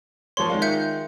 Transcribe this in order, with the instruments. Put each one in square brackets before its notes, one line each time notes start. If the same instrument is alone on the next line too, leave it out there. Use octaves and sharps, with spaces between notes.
[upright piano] F3 A#3 C#5 [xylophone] C6
[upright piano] D#3 G#3 F4
[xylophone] E5 G6 C#7